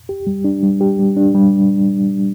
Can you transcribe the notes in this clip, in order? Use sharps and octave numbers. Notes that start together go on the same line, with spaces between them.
G4
G3
D4
G3
G4
G3
D4
G3